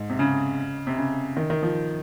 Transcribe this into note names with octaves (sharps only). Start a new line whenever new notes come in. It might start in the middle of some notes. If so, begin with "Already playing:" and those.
Already playing: G#2
C3
C#3
C3
C#3
D#3
D#3
F3